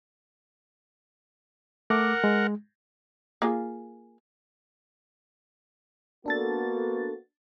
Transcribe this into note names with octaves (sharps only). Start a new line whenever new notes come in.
A3 A#4 F#5 D6
G#3
A#3 F4 G#4
A#3 B3 D4 F#4 A4 A6